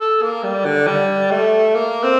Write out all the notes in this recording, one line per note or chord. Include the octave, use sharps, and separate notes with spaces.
A4
A#3
G3
D3
G3
A3
A#3
C4